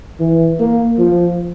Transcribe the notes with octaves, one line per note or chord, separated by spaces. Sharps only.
E3
A#3
F3